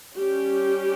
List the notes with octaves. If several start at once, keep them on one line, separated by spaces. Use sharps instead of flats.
G3 C#4 G4